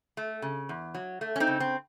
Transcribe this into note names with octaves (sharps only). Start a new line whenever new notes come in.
A3
C#3
E2
F#3
A3
C#4
C4 D#4
C#3
C4